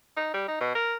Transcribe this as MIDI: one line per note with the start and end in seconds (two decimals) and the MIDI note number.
0.17 0.29 63
0.34 0.44 55
0.48 0.60 63
0.61 0.74 47
0.75 0.96 70